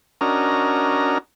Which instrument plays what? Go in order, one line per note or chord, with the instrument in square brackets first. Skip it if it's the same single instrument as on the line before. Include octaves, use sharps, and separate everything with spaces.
[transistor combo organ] C#4 D4 F#4 A#4 D#5 A#5